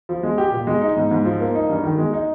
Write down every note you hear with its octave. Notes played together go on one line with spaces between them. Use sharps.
F3
G#3
G4
A#2
G#3
D#4
G#2
G#2
F3
A#3
D#4
G2
D#3
G#3
D#4